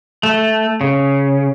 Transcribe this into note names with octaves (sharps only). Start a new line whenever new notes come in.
A3
C#3